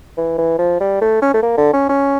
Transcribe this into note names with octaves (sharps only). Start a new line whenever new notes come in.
E3
E3
F3
G3
A3
C#4
A3
A#3
D3
C#4
C#4